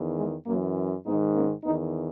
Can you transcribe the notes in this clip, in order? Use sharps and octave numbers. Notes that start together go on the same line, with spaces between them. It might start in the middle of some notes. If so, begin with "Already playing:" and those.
Already playing: E2 D#3
E3 G#3
F#2 E3 F#3 A#3
G#2 D#3 B3 D#4
A#3 C#4
E2 D#3 B3 D#4